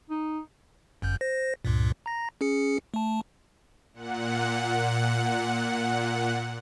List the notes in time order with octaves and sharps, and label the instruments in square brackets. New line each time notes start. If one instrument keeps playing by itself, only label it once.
[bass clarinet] D#4
[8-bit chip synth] G1 F#2 G6
C5 A#6
C#2 G2 A#2
A#5 A#6
C#4 G#4 C#7
A3 A5
[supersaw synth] A#2 F#5